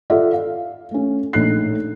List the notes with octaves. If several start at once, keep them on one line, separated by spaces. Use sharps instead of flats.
F4 A4 D5 E5 F#5
F5
A3 C#4
A#1 A2 D#4 F#6 C7